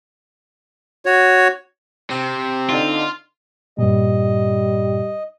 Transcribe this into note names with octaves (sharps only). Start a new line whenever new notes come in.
F#4 C#5
C3 C4
D3 D#4 F4
G2 A#2 G3 D#5